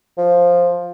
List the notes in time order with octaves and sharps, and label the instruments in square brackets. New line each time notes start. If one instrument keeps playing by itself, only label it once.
[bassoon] F3